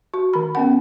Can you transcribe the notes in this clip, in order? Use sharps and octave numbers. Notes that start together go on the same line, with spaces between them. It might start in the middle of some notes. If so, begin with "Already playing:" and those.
F#4
D#3 B5
B3 C#4 F#5